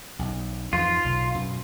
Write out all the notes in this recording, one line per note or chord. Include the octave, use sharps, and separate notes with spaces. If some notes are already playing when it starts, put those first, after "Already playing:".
B1
F2 G#2 E3 F4
B1
F#2 B2